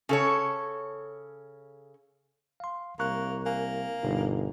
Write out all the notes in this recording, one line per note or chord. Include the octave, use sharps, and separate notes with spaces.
C#3 A4 C#5
F5 C6
C2 A#3 A#5 C#6 F#6
A#3 G#5
G1 B2 D#4